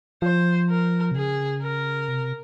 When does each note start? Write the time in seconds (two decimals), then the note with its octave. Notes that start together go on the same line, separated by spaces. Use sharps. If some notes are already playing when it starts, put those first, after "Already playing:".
0.22 F3 C5
0.69 A#4
1.12 C3
1.16 C#3 G#4
1.62 A#4
2.08 C3